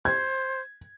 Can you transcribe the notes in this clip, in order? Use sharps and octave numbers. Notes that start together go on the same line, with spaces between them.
C5 G#6